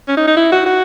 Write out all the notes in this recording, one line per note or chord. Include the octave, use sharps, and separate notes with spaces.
C#4
D#4
D#4
E4
F#4
F#4